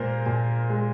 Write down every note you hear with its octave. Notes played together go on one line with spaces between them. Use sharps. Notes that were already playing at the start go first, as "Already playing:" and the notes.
Already playing: A#2 G#3 A#4 C5
A#2
G#3